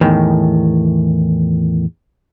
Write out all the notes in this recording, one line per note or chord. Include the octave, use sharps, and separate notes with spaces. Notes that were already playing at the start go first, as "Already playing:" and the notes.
E2 A2 D#3